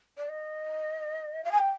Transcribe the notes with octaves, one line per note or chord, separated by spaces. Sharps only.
D5
D#5
F5
G#5
G5